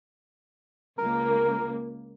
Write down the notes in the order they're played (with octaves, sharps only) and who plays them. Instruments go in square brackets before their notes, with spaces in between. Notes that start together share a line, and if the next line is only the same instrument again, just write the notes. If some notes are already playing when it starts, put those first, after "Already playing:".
[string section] C#2 A#3 [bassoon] A#4